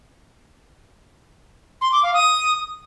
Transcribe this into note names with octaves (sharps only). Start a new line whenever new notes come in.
C6
D6
F5
D#6